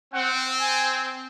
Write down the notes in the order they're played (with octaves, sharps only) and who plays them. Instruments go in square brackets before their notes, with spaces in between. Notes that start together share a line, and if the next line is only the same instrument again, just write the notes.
[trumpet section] C4 [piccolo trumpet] F#5
[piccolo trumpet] G#5